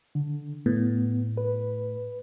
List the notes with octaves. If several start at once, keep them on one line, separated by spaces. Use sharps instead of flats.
D3
A2 B3
B4